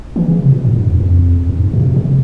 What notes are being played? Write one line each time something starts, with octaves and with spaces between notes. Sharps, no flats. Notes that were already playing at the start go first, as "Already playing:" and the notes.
E3
C#3
C3
A#2
G2
G2
E2
F2
E2
F2
G#2
A#2
C#3
C3
C3